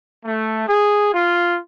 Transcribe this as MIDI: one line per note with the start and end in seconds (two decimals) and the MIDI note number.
0.23 0.66 57
0.66 1.09 68
1.13 1.58 65